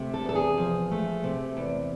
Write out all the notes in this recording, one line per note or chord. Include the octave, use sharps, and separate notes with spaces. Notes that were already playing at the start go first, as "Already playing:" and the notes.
Already playing: C3 A3
A4
E2 A4
G#4
F3
A3
C3
E2